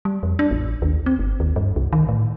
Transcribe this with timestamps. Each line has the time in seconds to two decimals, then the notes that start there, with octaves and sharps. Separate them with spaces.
0.05 G3
0.23 F2
0.39 D4
0.51 A1
0.82 D#2
1.06 C4
1.19 G1
1.40 D#2
1.56 G2
1.76 C2
1.93 D#3
2.09 A2